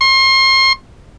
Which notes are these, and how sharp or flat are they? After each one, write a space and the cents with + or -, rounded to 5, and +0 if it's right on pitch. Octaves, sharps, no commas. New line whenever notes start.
C6 +35